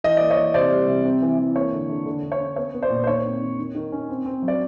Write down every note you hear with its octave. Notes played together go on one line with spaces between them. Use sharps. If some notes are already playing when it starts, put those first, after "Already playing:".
E3 D#5
A#3 D5
C#5 D#5
E3
C3 C5 D5
G3
C3
C4
E3
E3
A#3 C#5
D3
D3
D3
D3
C#5
C#4
B3 C#5
B3
C5 D5
A#2
C5
D#3 C#5
C4
D#3
D#3
D#3
C#4
C4
C4
F#3
D5